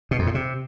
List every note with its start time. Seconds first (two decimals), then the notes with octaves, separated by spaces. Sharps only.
0.11 B2
0.19 F2
0.27 A2
0.35 C3